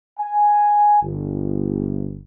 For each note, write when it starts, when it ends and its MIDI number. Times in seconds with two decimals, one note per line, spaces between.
0.18 0.98 80
1.02 2.18 31